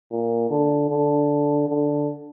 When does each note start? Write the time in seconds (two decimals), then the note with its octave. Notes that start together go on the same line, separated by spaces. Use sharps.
0.12 A#2
0.50 D3
0.90 D3
1.68 D3